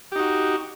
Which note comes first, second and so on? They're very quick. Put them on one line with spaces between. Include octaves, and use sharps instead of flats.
G4 D#4 F#4